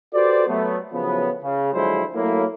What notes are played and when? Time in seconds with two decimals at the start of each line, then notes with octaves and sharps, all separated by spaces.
0.13 F#4 G4 A4 B4 C5 D5
0.47 F#3 A3 B3
0.93 A2 C#3 F3 F#3 B3
1.43 C#3
1.73 D3 F3 F#3 G#3 E4 C5
2.14 F#3 A3 A#3 E4